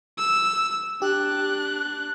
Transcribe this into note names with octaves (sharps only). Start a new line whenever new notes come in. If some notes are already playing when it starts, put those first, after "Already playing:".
E6
D4 G4 F#6